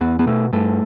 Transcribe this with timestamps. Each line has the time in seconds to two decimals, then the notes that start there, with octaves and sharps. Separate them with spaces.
0.01 E2 B3
0.19 B3
0.26 B2 A3
0.53 G2 A3